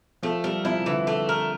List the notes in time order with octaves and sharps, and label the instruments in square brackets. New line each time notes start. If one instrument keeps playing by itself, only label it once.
[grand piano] F3 [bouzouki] A3
[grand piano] G3 [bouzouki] A#4
[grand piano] F3 [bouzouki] E4
[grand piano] C3
[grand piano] D3 [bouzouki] E3
[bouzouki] A3
A#4